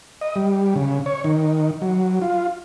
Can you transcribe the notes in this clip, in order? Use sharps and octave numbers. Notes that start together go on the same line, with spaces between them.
D#5
G3
C#3
C#5
D#3
F#3
F4